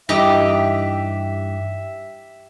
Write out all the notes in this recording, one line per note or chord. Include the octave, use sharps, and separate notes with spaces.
G2 E3 D#4 G4 D#5 E5